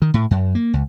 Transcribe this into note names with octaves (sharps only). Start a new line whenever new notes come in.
D#3
A2
F#2
A#3
C#2